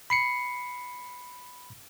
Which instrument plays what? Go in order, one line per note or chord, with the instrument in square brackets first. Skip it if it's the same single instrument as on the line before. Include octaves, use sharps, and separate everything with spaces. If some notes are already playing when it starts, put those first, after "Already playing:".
[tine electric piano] B5 C7 C#7